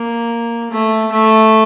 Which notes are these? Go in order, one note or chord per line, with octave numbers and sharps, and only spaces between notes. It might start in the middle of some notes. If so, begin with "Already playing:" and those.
Already playing: A#3
A3
A3